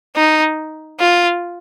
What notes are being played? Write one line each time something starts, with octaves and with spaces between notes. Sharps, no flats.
D#4
F4